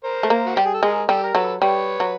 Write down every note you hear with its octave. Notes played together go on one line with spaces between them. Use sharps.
A#4 C5
A3
A#3
F#4
G3 G4
G#4
A4
G#3 G#4 A#4
G3 G4 A4
A#4
F#3 A4 B4
G3 B4 C#5
F#3